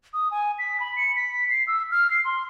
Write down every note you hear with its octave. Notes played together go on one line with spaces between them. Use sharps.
D#6
G#5
B6
B5
C#7
B6
C7
E6
F6
C7
C6